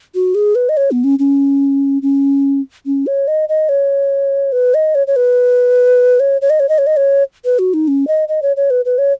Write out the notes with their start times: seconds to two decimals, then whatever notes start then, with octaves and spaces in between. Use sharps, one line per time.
0.15 F#4
0.35 G#4
0.55 B4
0.69 D#5
0.77 C#5
0.91 B3
1.04 C#4
1.19 C#4
2.02 C#4
2.86 C#4
3.07 C#5
3.28 D#5
3.49 D#5
3.69 C#5
4.52 B4
4.74 D#5
4.95 C#5
5.07 C#5
5.16 B4
6.20 C#5
6.41 C#5
6.50 D#5
6.60 C#5
6.69 D#5
6.78 C#5
6.87 D#5
6.97 C#5
7.45 B4
7.59 F#4
7.74 D#4
7.88 C#4
8.07 D#5
8.28 D#5
8.42 C#5
8.57 C#5
8.70 B4
8.85 B4
8.98 C#5